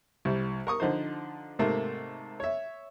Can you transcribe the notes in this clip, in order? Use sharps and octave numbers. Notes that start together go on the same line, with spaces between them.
C2 G3
A#4 C#6 D#6
D3 F3 D#4 C5
G#2 C3 A3 A#3
C#5 E5